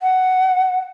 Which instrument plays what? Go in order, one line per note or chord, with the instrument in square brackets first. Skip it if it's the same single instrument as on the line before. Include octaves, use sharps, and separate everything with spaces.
[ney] F#5